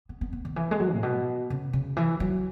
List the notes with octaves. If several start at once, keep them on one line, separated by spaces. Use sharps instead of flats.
B3
B3
B3
D#3
E3
G#3
F#3
A2
B2
C#3
C#3
E3
F#3